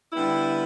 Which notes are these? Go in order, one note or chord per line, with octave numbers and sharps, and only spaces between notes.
D3 G3 B3 E4